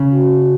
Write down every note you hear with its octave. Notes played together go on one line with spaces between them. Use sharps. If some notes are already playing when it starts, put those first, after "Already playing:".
Already playing: C#3
F#4